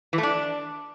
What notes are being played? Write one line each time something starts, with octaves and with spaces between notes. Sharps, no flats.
E3
A3
D4